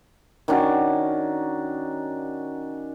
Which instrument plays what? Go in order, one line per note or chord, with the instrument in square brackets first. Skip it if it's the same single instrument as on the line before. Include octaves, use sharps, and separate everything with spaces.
[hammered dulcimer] D#3 C#4 D4 F#4